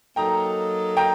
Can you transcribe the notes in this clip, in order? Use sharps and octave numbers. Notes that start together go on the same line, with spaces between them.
F#3 A#3 D#4 A4 G5 A#5
G5 A#5